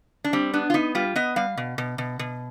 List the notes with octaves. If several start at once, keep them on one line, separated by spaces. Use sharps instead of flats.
D4
G3 C4
B3 D4
F4
B3 D#4
G3 F4
B3 D#5
G3 F5
B2
B2
B2
B2